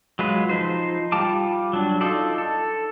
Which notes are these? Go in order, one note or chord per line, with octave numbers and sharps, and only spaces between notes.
F#3 G#3 F4 B4
F3 D#4 C5
G3 F4 G5 A5 D6
F#3 D4
D#4 F4 A4 D5
A4